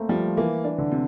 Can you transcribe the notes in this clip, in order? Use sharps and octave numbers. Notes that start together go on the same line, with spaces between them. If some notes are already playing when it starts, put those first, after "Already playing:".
Already playing: A3 A#3 C4
F3 G3
E3 A#3
D4
D3
C3